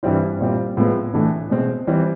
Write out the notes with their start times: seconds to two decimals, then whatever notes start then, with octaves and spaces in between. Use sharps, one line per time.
0.03 G2 E3 G3 C4 E4
0.41 A#2 G3 C4
0.77 A2 F3 G#3 B3
1.13 A2 E3 A3 D4
1.50 B2 G#3 C4
1.87 E3 G3 C4